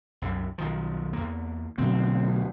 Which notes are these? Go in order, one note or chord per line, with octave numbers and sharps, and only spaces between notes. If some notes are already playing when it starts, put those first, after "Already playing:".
C2 F#2 C3
B1 D#3 F3
E2 A#3
D2 B2 F#3 C4